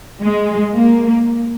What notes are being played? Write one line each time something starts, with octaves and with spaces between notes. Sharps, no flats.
G#3
A#3